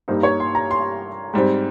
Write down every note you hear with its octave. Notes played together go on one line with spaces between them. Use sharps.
G2 G3 A#3 D#4 C5
C#5
C6
A#5
C6
G#2 G3 C4